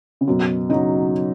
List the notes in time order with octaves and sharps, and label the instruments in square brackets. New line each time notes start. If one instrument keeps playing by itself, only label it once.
[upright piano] C#3
[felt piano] F#2 [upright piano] B2
[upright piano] C#3 [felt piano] F#3 D#4